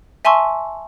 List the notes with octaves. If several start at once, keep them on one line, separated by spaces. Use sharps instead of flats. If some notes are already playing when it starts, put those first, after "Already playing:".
E5 G#5 A5 C6 C#6 E6